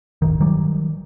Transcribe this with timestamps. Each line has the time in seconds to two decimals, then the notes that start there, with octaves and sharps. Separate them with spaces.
0.22 D1 G1 D#3
0.41 D#3 F#3 G3